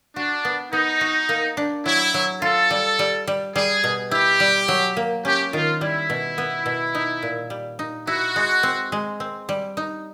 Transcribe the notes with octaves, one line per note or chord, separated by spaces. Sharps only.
D4 F#4
B3
B3 D#4
F#4
A#3
D4
F#3 E4
F#3
F4 A4
G3
G3
G3
G3 G#4
B2
E4 G4
G3
F#3
A#3
C#4 G4
D#3 F4
G3 E4
B2
B3
B2
D#4
A#2
G3
D#4
E4 F#4
G#3
C4
G#3
C4
G3
D#4